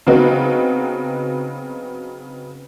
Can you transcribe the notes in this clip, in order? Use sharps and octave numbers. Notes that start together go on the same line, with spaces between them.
C#3 F#3 B3 C4 D#4 F#4